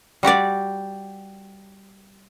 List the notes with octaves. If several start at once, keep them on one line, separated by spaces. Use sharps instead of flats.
G3 F#4 G4 D5